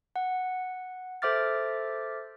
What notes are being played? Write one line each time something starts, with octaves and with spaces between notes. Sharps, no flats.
F#5
A4 C5 E5 D6 F6 A6